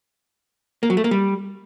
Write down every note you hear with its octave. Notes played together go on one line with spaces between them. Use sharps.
A#3
F#3
A3
A#3
G3